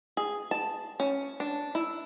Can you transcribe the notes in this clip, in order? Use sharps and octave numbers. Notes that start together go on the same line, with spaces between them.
G#4
A5
C#4
D4
E4